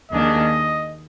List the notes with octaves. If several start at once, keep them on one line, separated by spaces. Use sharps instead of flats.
D#2 D#3 A#3 D4 G#4 D#5